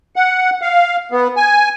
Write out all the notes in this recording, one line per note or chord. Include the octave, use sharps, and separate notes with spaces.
F#5
F5
B3
G#5